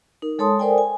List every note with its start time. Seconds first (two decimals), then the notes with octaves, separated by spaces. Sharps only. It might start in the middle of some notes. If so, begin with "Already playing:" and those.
0.22 D#4 A#4
0.39 G#3 A4 C#5 A5 C6 D#6
0.59 A4 A#4 C5 D5 G5 G#5
0.78 G#5